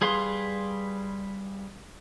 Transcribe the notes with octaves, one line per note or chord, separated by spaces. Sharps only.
G3 G#4 B4 F5 C6